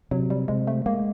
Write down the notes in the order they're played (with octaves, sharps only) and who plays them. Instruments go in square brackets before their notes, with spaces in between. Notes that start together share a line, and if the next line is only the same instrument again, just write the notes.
[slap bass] C3 [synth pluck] F#3
[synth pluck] G3
[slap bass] C3 [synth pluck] G#3
[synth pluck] A3
[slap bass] G#3 [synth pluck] A#3